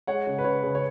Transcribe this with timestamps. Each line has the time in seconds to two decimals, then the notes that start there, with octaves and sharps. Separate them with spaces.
0.07 G#3 C#5 F#5
0.27 C#3
0.38 B4
0.44 C#3 C#5
0.63 C#3
0.75 C#5